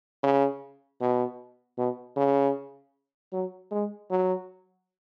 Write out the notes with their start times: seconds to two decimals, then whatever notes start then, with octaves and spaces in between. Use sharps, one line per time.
0.23 C#3
1.01 B2
1.78 B2
2.17 C#3
3.33 F#3
3.71 G#3
4.10 F#3